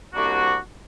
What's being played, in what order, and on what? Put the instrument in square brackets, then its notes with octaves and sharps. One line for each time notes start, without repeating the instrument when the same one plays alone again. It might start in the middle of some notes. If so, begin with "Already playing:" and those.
[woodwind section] C2 C3 G3 A#3 D4 F#4